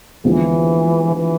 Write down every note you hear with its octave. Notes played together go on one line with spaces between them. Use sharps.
D#2 D3 E3 F3 G#3 B3
E3